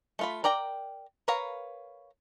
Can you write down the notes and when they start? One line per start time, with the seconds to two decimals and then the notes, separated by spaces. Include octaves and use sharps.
0.19 A3 F4 B5
0.44 A#4 D5 G5 A#5
1.28 A#4 B4 C#5 F5 A#5